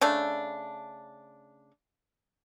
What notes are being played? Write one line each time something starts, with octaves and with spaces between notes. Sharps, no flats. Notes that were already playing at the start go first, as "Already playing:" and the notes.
C#3 A3 D4